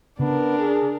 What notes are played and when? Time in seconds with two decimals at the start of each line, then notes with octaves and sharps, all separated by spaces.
0.19 C#3 B3 D4 A#4
0.59 G#4